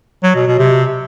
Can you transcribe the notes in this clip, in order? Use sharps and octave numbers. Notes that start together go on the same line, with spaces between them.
F#3
B2
B2
C3